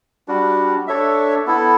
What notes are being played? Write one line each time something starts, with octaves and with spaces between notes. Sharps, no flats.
G3 D4 F#4
D4 A4 C#5 E5
B3 E4 A4